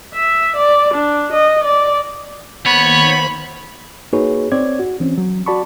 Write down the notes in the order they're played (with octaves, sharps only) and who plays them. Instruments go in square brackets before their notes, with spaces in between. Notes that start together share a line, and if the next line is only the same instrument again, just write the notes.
[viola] E5
D5
D4
D#5
D5
[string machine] D#3 A#3 C5 [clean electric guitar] B3 [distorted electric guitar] C#5 [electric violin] B5
[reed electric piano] A#3 D#4 F#4 G#4 B4 C#5
C4 C#5 D5 G#6
F#4
E3 C4 C#4
F#3
F#4 D5 A5 B5 C#6